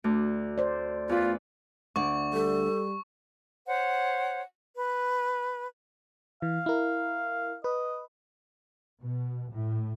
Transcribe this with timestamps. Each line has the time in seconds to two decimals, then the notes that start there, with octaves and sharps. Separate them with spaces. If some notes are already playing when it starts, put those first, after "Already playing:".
0.04 D2
0.58 C5 D5
1.09 E2 F4 B4
1.96 D2 D5 C#6
2.33 G3 A4
3.66 C5 C#5 F#5
4.75 B4
6.42 E3 F5
6.66 E4 A#4
7.64 B4 D#5
9.02 B2
9.52 A2